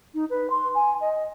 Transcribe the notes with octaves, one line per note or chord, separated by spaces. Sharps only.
D#4
B4
C6
G#5
D#5